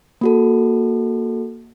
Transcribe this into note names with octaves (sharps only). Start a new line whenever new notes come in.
A#3 F#4 A4